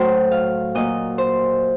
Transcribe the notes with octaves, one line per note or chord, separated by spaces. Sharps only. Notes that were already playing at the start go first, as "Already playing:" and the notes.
Already playing: A2 F#3 C5
F5
A#2 F#3 D#5
C5